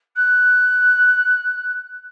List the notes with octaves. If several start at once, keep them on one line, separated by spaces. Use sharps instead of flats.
F#6